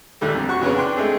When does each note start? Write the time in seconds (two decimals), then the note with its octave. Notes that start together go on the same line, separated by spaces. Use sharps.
0.21 D#2 A#2 D3 G3 A3
0.35 F2
0.49 F#4 C#6
0.61 F2 C#3 B3 C#4
0.76 D4 G5 C6 F#6
0.96 G#3 A3 C4 G#4